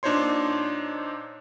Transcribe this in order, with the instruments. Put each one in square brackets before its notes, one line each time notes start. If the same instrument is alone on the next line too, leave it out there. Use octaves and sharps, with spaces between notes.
[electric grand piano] A#2 D4 D#4 C5 C#5 C6